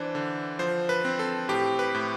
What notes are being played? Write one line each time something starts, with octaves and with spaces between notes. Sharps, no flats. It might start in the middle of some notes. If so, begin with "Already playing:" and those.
Already playing: E3 D4 C5
D3
F3 C5
B4
C4
A4
A2 G4
B4
A2